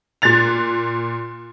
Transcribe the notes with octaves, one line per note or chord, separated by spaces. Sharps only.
A#2 F#6 A6 F7